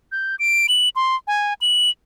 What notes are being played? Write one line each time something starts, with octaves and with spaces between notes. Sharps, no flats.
G6
D7
F#7
C6
G#5
F#7